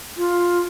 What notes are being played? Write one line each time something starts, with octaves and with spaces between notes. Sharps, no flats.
F4